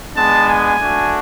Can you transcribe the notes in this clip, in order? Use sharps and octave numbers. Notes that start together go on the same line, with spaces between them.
G#3 B3 D4 A5
G#5
A3 D4 F#4